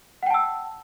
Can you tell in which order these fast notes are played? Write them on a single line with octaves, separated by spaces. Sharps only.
F#5 G5 A5 E6